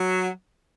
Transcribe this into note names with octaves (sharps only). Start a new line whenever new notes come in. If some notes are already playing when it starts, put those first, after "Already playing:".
Already playing: F#3